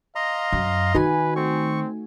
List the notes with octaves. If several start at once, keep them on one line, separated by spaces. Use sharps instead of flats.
D#5 F5 A#5 C6
F#2
D#3 D#4 F#4 B4 G#5
A3 C4 C#6